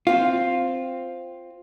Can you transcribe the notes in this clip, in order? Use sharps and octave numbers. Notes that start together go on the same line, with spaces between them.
C4 F4